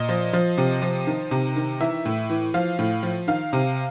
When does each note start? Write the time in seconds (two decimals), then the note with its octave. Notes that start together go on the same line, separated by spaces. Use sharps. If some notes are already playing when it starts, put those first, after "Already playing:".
Already playing: A#2 D#5
0.09 F3
0.33 F3
0.58 C3
0.82 F3
1.07 D#3
1.31 C3
1.56 D#3
1.80 E3 E5
2.05 A2
2.30 E3
2.54 F3 F5
2.79 A2
3.03 F3
3.28 D#3 F5
3.53 C3